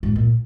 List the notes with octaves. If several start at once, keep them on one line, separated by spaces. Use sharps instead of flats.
G#2
D#3
A#2